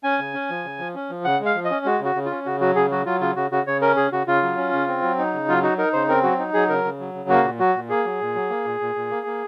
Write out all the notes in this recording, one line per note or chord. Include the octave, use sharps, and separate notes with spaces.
C#4 G#5
C#3
C#4
F3
C#3
F3
C#4
F3
C#3 F#5
G#3
F5
F3
D#5
C#4
G#3 F#4
C#3
F#4
C#3
F4
C#4
C#3 F#4
F#3 F#4
C#3 G#4
F#3 F#4
F#3 F4
C#3 F4
C#3 F#4
C#3 F#4
C#3 C#5
C#4 A#4
C#3 G#4
C#3 F#4
C#3 F4
F#3
C#4
C#3
C4
F#3
D#4
C#3
F#3 F4
D#4 F#4
D#4 A#4
C#3 C5
C4 A#4
F#3 F#4
D#4
F#3 G#4
C#3 A#4
C#3
F#3
C#3
A#3 F#4
A#2
F#3 F#4
A#2
A#3 G#4
F#3
A#2
F#3
A#3
A#2
A#2
A#2
A#3
A#3